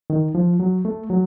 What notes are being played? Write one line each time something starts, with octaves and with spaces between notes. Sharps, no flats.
D#3
F3
F#3
A3
F#3